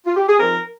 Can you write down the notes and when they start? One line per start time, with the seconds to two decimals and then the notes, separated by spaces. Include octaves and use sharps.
0.05 F4
0.16 G4
0.27 G#4
0.38 F3 C4 D#4 A#4